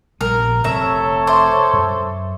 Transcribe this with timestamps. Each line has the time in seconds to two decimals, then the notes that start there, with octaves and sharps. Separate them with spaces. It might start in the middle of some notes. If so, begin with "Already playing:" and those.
0.21 A#1 G3 B3 A#4
0.64 F1 C4 A4 C#5 E5 A#5
1.27 C5 E5 C#6 D6
1.73 F#2